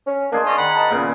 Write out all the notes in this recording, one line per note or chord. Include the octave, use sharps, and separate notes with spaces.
C#4
D#3 A#3 D4 G#4 C5
C#4 D5 D#5
D#3 F#5 B5
D5 D#5 A5
C#2 A#2 C#3 B3